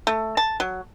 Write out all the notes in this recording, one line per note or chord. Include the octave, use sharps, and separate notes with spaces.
A3
A5
F#3